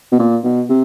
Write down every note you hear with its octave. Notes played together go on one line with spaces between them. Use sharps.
B2
A#2
B2
C3